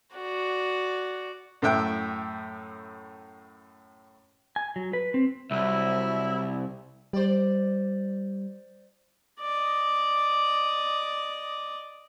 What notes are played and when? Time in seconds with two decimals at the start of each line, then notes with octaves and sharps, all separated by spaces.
0.14 F#4 D5
1.62 F#2 A2 E5 G5
4.56 G#5
4.76 F#3
4.93 B4
5.14 C4
5.51 C2 F#3 E4 E5
7.13 G3 C5 D5
9.40 D5 D#5